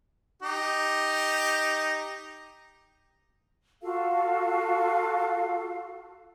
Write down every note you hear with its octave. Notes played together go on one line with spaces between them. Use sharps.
D#4 G4
F4 F#4 A4 F5